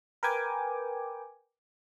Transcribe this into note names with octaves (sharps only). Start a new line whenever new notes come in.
A#4 B4 G5 G#5 D6